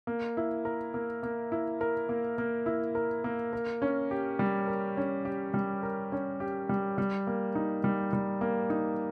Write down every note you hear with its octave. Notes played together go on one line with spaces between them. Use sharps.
A#3
E4
A#4
A#3
A#3
E4
A#4
A#3
A#3
E4
A#4
A#3
A#4
C#4
G4
G3
A#4
C#4
G4
G3
A#4
C#4
G4
G3
G3
A#3
D#4
G3
G3
A#3
D#4